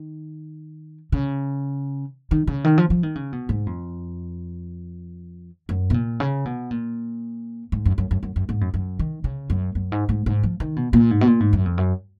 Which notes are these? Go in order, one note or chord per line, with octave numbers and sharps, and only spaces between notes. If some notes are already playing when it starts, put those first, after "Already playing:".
Already playing: D#3
C#3
D#3
C#3
D#3
F3
F3
D#3
C#3
B2
G#2
F2
F#2
B2
A#2
C#3
B2
A#2
G#2
F#2
F#2
F#2
F#2
F#2
G#2
F#2
F#2
D#3
C#3
F#2
F#2
G#2
G#2
G#2
F3
D#3
B2
A#2
G#2
B2
A#2
G#2
F#2
F2
F#2